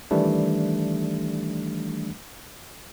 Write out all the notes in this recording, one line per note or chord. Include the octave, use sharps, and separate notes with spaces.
D#3 E3 G3 A3 D4